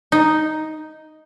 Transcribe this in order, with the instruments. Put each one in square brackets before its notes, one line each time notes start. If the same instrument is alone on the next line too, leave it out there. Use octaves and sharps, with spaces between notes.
[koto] D#4